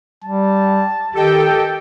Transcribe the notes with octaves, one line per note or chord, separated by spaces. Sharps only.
G3 A5
D#3 G4 A4 D#5 G5